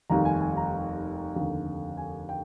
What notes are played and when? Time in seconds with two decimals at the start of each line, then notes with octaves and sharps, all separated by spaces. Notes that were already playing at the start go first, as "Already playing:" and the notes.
0.10 F1 D#2 D#3 G3 A#5
0.25 G#5
0.41 G#5
0.57 A#5
1.35 F1 D#2 D3
1.97 G#5
2.29 G5